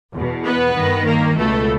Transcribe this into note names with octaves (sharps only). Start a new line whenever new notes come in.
E2 B2
B3 B4
G2 D#3
A#3 A#4
C#2 B2 A3 A4